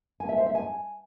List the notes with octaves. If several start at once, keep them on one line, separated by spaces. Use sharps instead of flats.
G#5
E5
C5
E5
G#5